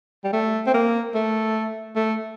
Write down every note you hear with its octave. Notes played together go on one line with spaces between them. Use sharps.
G3
A3
C4
A#3
A3
A3